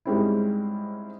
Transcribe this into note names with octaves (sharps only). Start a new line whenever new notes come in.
G#2 G3 G#3 C4 C#4 E4